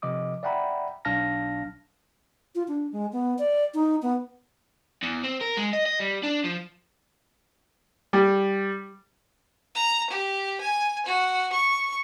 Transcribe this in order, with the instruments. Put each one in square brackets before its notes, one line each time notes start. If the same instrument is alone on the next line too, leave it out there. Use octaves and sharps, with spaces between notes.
[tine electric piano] C3 F3 D#5 D6 D#6
D5 E5 F#5 G5 A#5 B5
B1 D4 F5 A5 F6 A#6
[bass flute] F4
D4
G#3
B3
D5
D#4
B3
[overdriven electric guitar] E2
C4
A#4
G#3
D#5
D#5
G3
D4
F3
[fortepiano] G3
[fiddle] A#5
G4
G#5
F#4
C#6